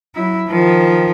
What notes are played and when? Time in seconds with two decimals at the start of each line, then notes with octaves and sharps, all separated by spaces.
0.15 F#3 E4
0.47 D#3 F3